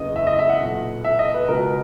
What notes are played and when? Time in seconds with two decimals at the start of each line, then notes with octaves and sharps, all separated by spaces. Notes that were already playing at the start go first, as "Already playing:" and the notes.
Already playing: F#1 E2 C#3 E3 D#5
0.16 E5
0.27 D#5
0.39 E5
0.49 F#5
0.61 B1 A#2
1.05 E5
1.19 D#5
1.34 B4
1.49 C#2 B2 A#4